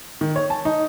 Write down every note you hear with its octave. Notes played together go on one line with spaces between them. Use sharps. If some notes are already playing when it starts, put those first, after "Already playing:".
D#3
C#5
A5
D#4